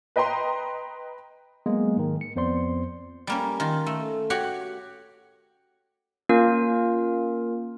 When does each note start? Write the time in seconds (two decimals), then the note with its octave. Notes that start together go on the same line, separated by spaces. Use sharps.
0.16 B4 D#5 G5 A#5 C6
1.66 F#3 G#3 A#3 B3
1.97 G#2 D#3
2.21 C#7
2.36 F2 B3 C5 D5 C6
3.27 G3 A#3 C#4
3.60 D#3 F4
3.87 A3
4.30 F#4 G4 C#5 F#5
6.29 A#3 C#4 F4 A#4